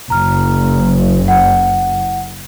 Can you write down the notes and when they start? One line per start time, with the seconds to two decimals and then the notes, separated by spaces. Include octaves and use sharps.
0.10 F#1 A#5 F6
1.28 F#5